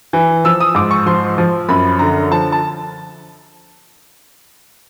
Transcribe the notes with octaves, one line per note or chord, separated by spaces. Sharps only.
E3
F3 E6
D#6
G#2 D6
C#6
F3 C6
F3
F#2 B5
D3 A#5
F3 A5
A5